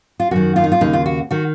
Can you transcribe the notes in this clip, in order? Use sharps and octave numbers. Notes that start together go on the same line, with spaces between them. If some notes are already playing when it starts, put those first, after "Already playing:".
F4
F#2 D#3 F#4
F4
D#4
F4
D#2 C#3 D#4
F4
F#4
D#3 F#4